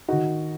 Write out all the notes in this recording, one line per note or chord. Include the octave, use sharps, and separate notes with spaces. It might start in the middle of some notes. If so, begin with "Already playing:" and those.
D#3 D#4 F#4